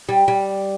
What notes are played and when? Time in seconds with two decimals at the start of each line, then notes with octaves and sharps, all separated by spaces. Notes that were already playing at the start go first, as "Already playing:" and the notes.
0.09 G3
0.28 G3